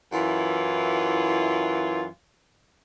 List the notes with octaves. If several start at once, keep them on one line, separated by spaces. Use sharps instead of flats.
F#2 E3 E4 F4